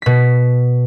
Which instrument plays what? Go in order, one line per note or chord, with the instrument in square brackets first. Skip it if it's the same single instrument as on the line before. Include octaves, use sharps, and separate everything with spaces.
[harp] B2 B6